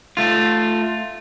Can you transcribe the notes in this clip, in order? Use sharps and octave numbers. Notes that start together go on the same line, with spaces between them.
A3 F4